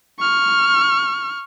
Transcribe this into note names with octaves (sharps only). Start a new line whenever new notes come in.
C#6 F6